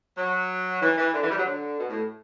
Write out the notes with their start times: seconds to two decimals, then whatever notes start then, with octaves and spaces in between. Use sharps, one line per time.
0.17 F#3
0.82 E3
0.98 E3
1.13 D3
1.22 E3
1.30 G3
1.37 F#3
1.45 D3
1.79 B2
1.89 A2